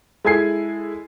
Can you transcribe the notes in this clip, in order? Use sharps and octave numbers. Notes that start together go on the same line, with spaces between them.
G#3 E4 A4 G#5 G#6 C7